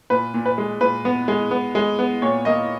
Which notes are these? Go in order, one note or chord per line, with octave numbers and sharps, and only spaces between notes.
A#2 B4
A#2
B4
G#3
A#2 B4
B3
G#3
B3
G#3
B3
A#2 C#5
A#3 D#5